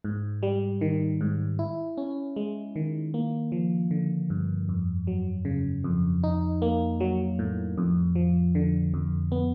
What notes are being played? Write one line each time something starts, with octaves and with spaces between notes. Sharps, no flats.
G#2
G3
D#3
G#2
E4
C#4
G#3
D#3
A#3
F3
D3
G2
F2
F#3
C#3
F2
D#4
A#3
F#3
A2
F2
F3
D3
F2
B3